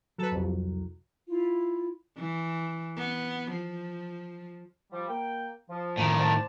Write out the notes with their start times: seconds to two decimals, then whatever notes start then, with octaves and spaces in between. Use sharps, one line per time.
0.18 F#3 A4 B4
0.31 C2 F2
1.29 E4 F4
2.18 E3
2.97 B3
3.52 F3
4.92 F3 G3
5.09 A#3 G5
5.70 F3
5.97 A2 D#3
6.18 C5 D5 A5